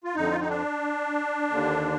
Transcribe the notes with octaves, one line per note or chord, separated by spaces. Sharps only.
F4
F2 D3 D#4
F4
D#4
D4
D#2 D3